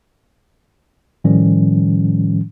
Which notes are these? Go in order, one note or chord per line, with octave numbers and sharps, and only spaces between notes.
A2 D#3 F3 G3 C#4